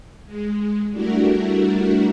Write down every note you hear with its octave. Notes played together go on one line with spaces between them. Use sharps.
G#3
G3 A3 D4 E4 F#4 A#4